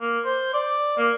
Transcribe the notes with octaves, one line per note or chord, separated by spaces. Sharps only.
A#3
C5
D5
A#3